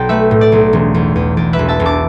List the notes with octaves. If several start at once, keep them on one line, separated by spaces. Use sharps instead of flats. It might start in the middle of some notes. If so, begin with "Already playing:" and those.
Already playing: B1 D5 G5
A3 B4 E5
A2
D5
B1
E1
E2
E2
E2 D5
B4 E5
E1
E5 A5
E1
A5 D6